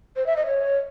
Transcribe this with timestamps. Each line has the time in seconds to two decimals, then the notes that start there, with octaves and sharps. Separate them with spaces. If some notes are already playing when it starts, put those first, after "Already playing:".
0.16 C5
0.26 E5
0.36 D#5
0.47 C#5